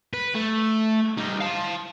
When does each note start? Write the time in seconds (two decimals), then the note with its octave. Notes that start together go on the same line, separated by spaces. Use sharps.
0.13 B4
0.35 A3
1.17 G3 D#4
1.40 F5 A5